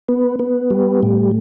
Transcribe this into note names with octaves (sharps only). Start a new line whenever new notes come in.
B3
B3
G3
A2